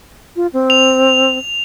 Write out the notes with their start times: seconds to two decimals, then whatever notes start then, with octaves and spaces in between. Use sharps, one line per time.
0.36 F4
0.53 C4
0.70 F7